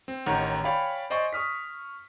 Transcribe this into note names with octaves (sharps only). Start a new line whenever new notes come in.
C4
A1 D#3 G4 C#5 F#5 A#5
C#5 D5 F5 G5 G#5 B5
C5 D5 D#5 G#5 C6 C#6
C#6 D#6 F6 B6